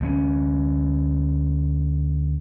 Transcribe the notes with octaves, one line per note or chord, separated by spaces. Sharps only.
D2 A3 C#4